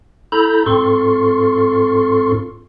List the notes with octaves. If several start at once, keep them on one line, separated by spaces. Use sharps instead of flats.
E4 A4 A#5 B5 G6
G#2 C4 F4 A4 C6 C#6